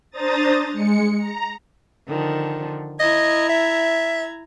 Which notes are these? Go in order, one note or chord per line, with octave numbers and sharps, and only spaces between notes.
D4 C5 A#5 D#6 A6
G#3 C#7
A#5
D3 D#3 F3
E4 D#5 A#5 G#6
E5